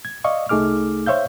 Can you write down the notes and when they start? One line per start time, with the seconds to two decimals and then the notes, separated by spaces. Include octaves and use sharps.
0.05 G#6
0.24 D5 D#5 F5 C#6
0.49 C2 A3 D#4 G#4 D6 F6
1.06 C5 C#5 E5 F5 G6